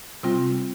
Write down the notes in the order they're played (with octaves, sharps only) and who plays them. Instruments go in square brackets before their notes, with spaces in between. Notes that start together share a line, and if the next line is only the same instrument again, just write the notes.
[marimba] C3 G3 C4 F4